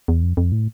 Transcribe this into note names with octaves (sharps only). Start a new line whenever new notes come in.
E2
F2
F2
A2